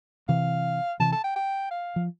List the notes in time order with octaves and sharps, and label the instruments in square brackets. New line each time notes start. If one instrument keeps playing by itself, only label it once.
[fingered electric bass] C3 E3 [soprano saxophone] F5
[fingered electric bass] C3 E3 [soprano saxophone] A5
[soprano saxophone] A5
G5
G5
F5
[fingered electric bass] F3